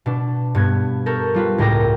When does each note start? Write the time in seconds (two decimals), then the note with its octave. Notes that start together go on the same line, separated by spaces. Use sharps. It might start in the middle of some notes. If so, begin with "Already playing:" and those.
0.06 B2 D4
0.55 G2 B3 G#6
1.06 A4 A#4 C#6 G6
1.34 G3 F4 B4
1.58 C#2 A2 A#4 G5 D6 A#6